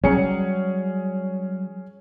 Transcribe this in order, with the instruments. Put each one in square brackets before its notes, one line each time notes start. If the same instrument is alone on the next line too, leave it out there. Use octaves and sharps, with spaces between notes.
[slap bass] F#3 G3 [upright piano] C#4 G#4 C#7